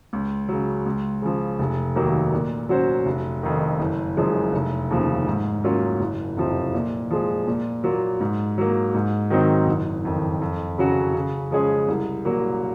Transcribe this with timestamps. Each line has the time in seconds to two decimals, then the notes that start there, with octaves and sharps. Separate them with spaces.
0.13 C#2
0.48 C#3 F#3
0.86 C#2
1.22 C#3 F3
1.59 F1
1.95 D#2 D#3 F#3 A#3
2.33 A#2
2.69 F#3 C#4 F#4 C5
3.06 F1
3.43 F2 D#3
3.79 F#1
4.17 F#2 F3 G#3
4.53 F1
4.90 D#2 C#3 F3
5.27 G#2
5.64 F#3 A#3 C#4 F4
6.00 F#1
6.37 F2 C3 F3
6.74 A#2
7.11 F3 G#3
7.47 A#2
7.84 F#3 A#3 F4
8.20 G#2
8.58 F#3 A#3
8.94 G#2
9.30 D#3 F#3 C4 D#4
9.67 F#1
10.05 F2 D#3
10.41 F2
10.78 C#3 F#3 C#4 F#4
11.14 C#3
11.51 F3 G#3 C#4 G#4
11.88 C2
12.25 A#2 F#3 A#3